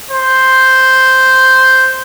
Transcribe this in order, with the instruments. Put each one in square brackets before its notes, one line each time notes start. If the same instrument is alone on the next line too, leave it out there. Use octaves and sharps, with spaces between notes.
[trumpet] C5